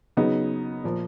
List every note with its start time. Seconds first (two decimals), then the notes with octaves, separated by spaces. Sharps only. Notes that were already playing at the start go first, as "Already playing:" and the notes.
0.17 C#3 F#3 B3 D#4
0.84 A#2 F3 A#3